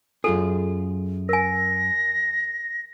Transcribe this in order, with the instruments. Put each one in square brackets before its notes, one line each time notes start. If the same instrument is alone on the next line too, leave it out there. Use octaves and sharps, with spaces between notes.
[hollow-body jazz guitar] F#2 F4 G#4 [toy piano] A4
[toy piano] A#4 G#5 [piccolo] A#6